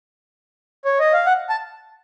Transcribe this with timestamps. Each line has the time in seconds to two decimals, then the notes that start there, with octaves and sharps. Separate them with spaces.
0.85 C#5
0.99 D#5
1.13 F5
1.26 F#5
1.49 A5